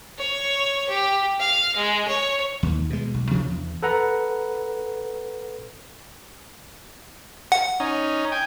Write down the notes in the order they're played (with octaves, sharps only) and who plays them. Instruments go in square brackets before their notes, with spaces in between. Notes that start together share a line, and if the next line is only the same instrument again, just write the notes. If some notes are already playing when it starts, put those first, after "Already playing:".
[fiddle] C#5
G4
F5
G#3
C#5
[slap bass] D#2
B2 G#3
B1
C3 F3 F#3 D4
E2
[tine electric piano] A4 B4 F#5 A#5
[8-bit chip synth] F#5
[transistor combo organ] C#4 D#4
G5 G#5